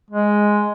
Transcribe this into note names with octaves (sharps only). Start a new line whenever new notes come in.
G#3